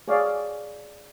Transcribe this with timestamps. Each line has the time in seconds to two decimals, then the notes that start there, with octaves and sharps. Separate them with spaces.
0.08 G#4 C#5 D5 F5